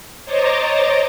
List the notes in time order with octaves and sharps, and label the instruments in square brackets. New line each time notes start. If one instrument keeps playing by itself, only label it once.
[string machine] C5 C#5 D#5 A#5 D6 A6